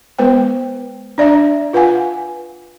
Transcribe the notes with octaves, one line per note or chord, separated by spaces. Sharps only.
G#3 B3 B4 C5 G5
D4 D5 E5 A#5
F4 B4 F5 F#5 G#5